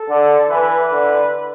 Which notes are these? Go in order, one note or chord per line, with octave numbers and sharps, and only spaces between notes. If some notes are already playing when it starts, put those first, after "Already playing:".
Already playing: A4
D3
E3 B4
D3